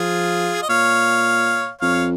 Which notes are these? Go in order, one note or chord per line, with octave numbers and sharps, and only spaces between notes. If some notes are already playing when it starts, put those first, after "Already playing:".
Already playing: F3 F4 G#4
D#5
A#2 C#5 F5
F2 C#5 F5